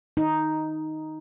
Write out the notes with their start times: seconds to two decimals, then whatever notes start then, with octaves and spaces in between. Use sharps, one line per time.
0.17 D#4